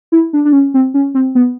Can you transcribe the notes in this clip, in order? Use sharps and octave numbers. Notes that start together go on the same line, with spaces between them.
E4
D4
D4
C#4
C4
C#4
C4
B3